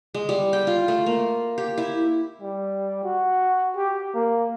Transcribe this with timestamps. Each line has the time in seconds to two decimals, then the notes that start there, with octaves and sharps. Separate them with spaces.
0.14 G#3
0.29 G3
0.53 G5
0.67 F4
0.88 A3
1.06 A#3
1.58 G4
1.78 E4
2.41 G3
3.04 F#4
3.76 G4
4.14 A#3